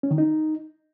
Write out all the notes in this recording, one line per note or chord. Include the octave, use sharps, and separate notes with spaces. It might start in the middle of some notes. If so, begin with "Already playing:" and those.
C#4
D#3
D#4